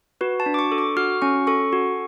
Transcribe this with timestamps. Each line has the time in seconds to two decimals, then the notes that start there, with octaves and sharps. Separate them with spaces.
0.21 F#4 B4
0.40 A5
0.46 D4
0.54 D6
0.59 C#6
0.72 A4
0.78 D6
0.97 F#4 F6
1.22 C#4 C#6
1.47 A4 C#6
1.73 F#4